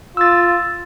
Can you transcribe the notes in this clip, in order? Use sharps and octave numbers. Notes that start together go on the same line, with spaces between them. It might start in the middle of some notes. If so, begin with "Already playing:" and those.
F4 E6 A6